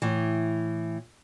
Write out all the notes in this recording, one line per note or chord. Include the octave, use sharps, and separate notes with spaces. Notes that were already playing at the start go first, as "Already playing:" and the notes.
A2 E3